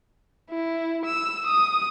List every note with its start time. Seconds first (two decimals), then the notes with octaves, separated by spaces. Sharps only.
0.50 E4
1.06 E6
1.47 D#6